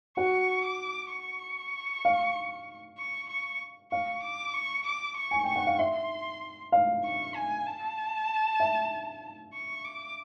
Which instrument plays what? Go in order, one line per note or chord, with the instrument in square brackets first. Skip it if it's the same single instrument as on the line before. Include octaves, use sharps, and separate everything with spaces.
[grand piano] F#4 F#5 [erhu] C#6
[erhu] D6
C#6
[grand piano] F5
[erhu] C#6
C#6
[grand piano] F5 [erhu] C#6
[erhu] D6
C#6
D6
C#6
[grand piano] G#5
[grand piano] G5 [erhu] C#6
[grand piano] F#5
F5
[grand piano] E5 [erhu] C6
[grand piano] F5
[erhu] C#6
G#5
A5
[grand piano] E5
[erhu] C#6
D6